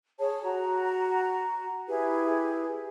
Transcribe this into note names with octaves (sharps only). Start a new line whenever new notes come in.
G#4 C#5 A5
F#4 A#5
E4 G4 G#4 B4